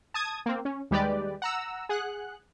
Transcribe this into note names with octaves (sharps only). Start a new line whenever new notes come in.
A5 D#6 G#6
A#3 C4
C#4
D#2 G3 G#3 G4 B4 D5
F#5 A#5 E6
G#4 F#5 F#6